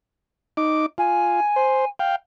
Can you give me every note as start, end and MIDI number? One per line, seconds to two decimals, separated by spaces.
0.57 0.86 63
0.57 0.86 86
0.98 1.40 65
0.98 1.87 80
1.56 1.85 72
1.99 2.16 77
1.99 2.16 79